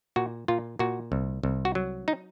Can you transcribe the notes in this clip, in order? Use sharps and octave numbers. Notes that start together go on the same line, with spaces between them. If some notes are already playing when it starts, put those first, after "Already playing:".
A#2 F#4
A#2 F4
A#2 F#4
C2
C2
F#4
F#3
D#4